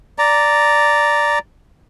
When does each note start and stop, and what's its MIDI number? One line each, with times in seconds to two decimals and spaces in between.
0.19 1.39 74
0.19 1.39 82